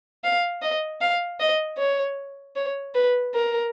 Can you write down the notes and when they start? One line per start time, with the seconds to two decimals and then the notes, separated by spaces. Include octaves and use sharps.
0.24 F5
0.62 D#5
1.01 F5
1.40 D#5
1.78 C#5
2.56 C#5
2.95 B4
3.35 A#4